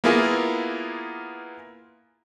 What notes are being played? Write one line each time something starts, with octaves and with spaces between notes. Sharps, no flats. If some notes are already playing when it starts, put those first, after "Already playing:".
A#3 B3 E4 F4 G#4 A#4